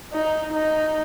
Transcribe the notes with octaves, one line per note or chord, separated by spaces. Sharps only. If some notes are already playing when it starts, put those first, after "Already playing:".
D#4
D#4